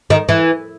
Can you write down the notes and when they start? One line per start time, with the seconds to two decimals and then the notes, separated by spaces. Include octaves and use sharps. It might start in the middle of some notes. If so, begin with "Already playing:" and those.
0.10 D#3
0.29 E3